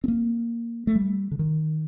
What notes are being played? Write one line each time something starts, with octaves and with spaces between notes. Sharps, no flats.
C4
A#3
A3
G3
D3
D#3